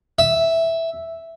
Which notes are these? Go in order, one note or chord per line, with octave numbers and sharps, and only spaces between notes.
E5